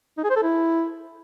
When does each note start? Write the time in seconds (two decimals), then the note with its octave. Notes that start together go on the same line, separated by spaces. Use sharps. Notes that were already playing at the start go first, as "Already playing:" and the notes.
0.18 D#4
0.24 G#4
0.30 C5
0.36 A4
0.43 E4